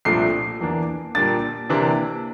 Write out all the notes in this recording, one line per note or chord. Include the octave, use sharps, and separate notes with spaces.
C2 A#2 F3 A3 D4 C7
E2 E3 A#3 D4
A#2 G3 A#3 D4 A6
C3 E3 A#3 D4